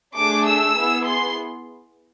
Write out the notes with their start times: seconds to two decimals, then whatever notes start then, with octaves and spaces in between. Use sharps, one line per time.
0.16 A3 D4 G#4 D6
0.46 E6
0.76 B3 E4 G#4
1.06 C6